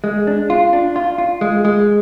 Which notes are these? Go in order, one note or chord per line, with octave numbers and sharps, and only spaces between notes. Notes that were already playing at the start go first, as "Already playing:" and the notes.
G#3
D4
F4
D4
F4
F4
G#3
G#3